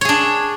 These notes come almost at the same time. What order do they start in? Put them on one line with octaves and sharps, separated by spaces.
C#5 G#4 D4